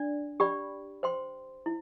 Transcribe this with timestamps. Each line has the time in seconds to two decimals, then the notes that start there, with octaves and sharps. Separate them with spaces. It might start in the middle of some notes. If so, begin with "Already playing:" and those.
Already playing: D4 D5
0.40 G4 D5 G5 B5
1.03 C5 G5 C6
1.66 E4